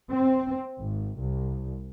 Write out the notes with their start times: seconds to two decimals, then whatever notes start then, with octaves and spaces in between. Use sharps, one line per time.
0.11 C4
0.79 G#1
1.18 C2